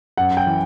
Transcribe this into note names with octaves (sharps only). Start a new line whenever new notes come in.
F#2 F#5
G5
E3